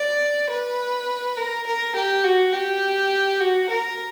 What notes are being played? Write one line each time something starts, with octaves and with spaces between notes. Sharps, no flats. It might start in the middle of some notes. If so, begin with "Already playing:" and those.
Already playing: D5
B4
A#4
A#4
G4
F#4
G4
F#4
A#4